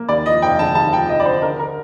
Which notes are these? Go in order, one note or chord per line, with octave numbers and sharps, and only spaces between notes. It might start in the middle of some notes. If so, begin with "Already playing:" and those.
Already playing: A#3
D#2 D5
F3 D#5
F1 G5
D3 A5
D#2 A5
F3 G5
F1 D#5
D5
D3 C5
D3 A#4
A#4